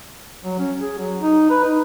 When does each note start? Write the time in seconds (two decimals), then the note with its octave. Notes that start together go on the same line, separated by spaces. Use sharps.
0.45 F#3
0.59 C#4
0.80 G#4
0.99 F#3
1.21 D#4
1.50 B4
1.64 D#4